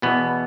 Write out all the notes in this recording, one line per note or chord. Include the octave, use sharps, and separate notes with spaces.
E2 B2 B3